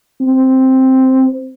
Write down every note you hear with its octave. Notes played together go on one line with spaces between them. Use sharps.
C4